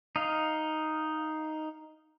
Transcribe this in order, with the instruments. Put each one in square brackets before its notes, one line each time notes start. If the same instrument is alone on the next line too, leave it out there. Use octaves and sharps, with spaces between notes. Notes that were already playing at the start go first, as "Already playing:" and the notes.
[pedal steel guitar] D#4 F5